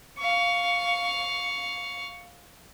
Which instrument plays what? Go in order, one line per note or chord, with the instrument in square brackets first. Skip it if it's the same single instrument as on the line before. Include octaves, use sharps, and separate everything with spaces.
[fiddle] F5 C#6